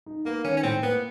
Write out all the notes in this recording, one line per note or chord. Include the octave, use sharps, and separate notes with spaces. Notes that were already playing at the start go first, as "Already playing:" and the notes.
D#4
A#3 B3
D#3 C#4
C#4
A2 C4
A#3 B3